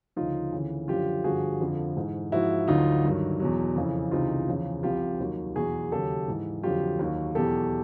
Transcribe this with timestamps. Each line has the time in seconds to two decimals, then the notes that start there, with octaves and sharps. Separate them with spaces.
0.16 D2 C#3 F3 D#4 F4
0.52 D2 C#3 E3
0.88 F#2 D3 F3 F4 G4
1.24 G2 D3 F3 F#4 G#4
1.60 F2 D3 F3
1.97 G#2 E3
2.32 G#2 F3 E4 F#4
2.68 D2 D3 F#3 D#4 F4
3.04 G2 D#3 F#3
3.40 E2 B2 F#3
3.75 F2 C#3 E3
4.11 C#2 C3 E3 D#4 F4
4.48 E2 C#3 F3
4.83 C2 C3 F3 F4 G4
5.20 D#2 D#3 F#3
5.55 E2 B2 F#3 F#4 G#4
5.92 D#2 C#3 F#3 G4 A4
6.28 G#2 E3
6.63 F2 D3 F#3 F4 G4
6.99 D#2 D#3 F#3
7.35 E2 B2 F#3 G4 A4